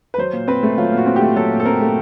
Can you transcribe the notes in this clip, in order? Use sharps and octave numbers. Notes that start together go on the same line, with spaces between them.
B4
F#3 C5
A#2
C4 B4
A3
F#3 F4
A#2
F#4
C4
A3 G4
F#3 A4
A#2
A4
C4 A#4
A3